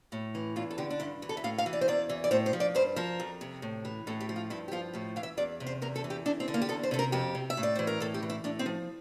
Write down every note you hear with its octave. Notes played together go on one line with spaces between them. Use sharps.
A2
E3
E2 F4
A4
D3 G4
D4
G2 E4
E3
A4
E5
A2 F5
F5
E3
D5
C5
E2 D5
E3
D5
A2 C5
C5
F3
D5
G2 C5
F3 A#4
F2
C3
A2
E3
A2 A4
G4
F3
F4
G2 E4
G4
F3 F4
A2 G4
E3 F5
E5
E2 D5
C3
C5
E2 A#4
A4
E3
G4
E2 D4
C4
D3
A#3
G4
E2 A4
C5
C3 A4
A#4
F2 G4
C3
E5
A2
D5
E3 C5
A#4
A2 A4
G4
E3
E4
A2 D4
C4
F3